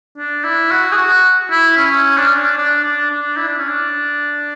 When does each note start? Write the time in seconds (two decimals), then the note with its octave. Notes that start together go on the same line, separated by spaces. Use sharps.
0.18 D4
0.44 E4
0.71 F#4
0.92 G#4
0.97 F#4
1.51 E4
1.78 C#4
2.17 D4
2.27 C#4
2.37 D4
2.57 D4
2.84 D4
3.10 D4
3.37 E4
3.48 D4
3.58 C#4
3.68 D4